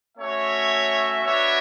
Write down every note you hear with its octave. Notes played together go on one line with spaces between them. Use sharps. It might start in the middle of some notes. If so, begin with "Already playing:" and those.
A3 C#4 F#4 C#5 E5
B3 D4 F#4 C#5 E5